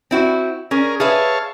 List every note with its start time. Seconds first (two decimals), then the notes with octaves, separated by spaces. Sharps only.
0.11 C4 E4 F#4
0.71 C#4 G#4 A#4
1.00 G#4 B4 C#5 E5 F5 A5